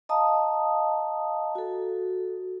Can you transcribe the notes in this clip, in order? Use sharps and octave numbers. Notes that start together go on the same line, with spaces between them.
D#5 F5 A5 A#5 D#6
F#4 A4